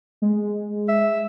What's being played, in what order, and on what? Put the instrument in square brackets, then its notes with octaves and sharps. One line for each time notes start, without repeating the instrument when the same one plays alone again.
[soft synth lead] G#3
[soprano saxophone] E5